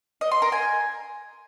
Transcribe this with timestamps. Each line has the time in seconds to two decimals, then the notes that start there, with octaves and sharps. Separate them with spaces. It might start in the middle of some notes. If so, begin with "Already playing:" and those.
0.21 D#5
0.32 C6
0.42 A#4
0.52 G#5